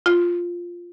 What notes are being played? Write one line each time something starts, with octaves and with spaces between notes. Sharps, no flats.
F4